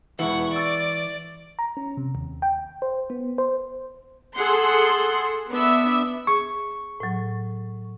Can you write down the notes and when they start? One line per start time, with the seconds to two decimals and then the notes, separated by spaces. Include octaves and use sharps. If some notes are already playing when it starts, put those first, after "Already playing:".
0.19 E1 E3 E4 E5 F#5 C#6 F#7
0.54 D5 C#6 E6 A6
1.59 A#5
1.77 C#4
1.97 C3
2.15 D#2
2.42 G5
2.82 C5
3.10 B3
3.38 C5
4.36 G#4 A4 F#5 C6
5.50 B3 D4 E5
6.27 G#4 C#6
7.00 A2 F#3